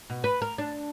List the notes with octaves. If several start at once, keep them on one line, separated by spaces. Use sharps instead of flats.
B2
B4
A#4
D4